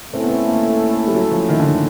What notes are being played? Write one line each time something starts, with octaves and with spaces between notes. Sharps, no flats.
A3 C4 C#4 E4 A4
B3
C4
A#3
G3
F#3
F3
D#3
D3
D#3